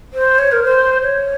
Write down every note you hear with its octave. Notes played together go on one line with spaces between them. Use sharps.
C5
C#5
A#4
C5
C#5